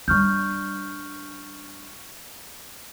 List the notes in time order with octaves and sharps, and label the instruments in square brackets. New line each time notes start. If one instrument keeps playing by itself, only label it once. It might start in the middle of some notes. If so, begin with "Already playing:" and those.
[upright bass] G3 D4 [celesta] C#6 F6 G6